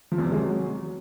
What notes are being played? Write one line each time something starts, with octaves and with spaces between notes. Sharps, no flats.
F3
E2
C3
G#3
F#3